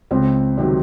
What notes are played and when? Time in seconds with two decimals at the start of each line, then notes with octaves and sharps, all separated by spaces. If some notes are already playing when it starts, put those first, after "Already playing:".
0.11 C#2 C4
0.58 C3 D#3 F#3